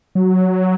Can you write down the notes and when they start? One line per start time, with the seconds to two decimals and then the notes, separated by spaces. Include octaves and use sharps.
0.15 F#3